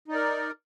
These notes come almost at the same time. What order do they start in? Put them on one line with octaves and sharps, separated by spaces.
D#4 D5 A#4